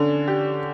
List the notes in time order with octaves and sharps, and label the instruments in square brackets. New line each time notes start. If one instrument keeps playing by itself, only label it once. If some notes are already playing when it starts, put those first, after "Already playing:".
Already playing: [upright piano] D3 C#4 [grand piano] D4
[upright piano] G4